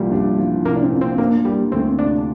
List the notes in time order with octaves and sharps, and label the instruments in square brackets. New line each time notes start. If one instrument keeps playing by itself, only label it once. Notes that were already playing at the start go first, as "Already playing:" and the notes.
Already playing: [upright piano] C2 A#2 F3 [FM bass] G3
[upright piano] D4
F3
[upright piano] C2 [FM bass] A#3
[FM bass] D4
C4
[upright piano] A#2
[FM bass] C4
[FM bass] A#3 [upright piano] D4
[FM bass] G3 [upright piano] A#3
[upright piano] D2 [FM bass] C4
[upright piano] C3 [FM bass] D4